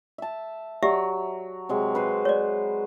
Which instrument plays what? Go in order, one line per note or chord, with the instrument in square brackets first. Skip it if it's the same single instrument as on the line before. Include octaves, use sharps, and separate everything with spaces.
[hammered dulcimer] E5 A5
[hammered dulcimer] F#3 [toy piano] G4 D5 E5
[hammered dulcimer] C3 F#3 G#3
B4 C5
[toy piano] C#5 D5